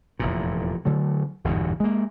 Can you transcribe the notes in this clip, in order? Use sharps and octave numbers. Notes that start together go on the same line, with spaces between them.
F1 E2 A#2
D3 F#3 A3
G1 E2 G#2 B2
G#3 A#3